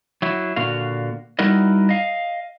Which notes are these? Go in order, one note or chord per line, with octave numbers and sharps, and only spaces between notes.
F#3 E4
A#2 D3 F#4 F5
G3 D#4 E4 F#4 A#4 D#5
D#5 F5